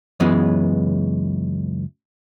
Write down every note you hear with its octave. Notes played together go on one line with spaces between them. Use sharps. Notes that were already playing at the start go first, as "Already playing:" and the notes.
C#2 F#2 C#3 E3 G#3 B3